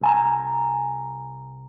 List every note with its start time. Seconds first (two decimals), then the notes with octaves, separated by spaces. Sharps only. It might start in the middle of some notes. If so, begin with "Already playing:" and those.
0.01 C2 G#5 A#5